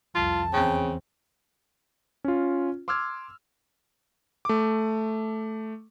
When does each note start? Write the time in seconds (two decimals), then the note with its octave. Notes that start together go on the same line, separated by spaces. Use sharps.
0.15 C2 F2 F4 A5
0.53 E2 C#3 C4 G5
2.24 C#4 F4
2.88 C6 D6 E6 F6 G#6
4.45 A3 D6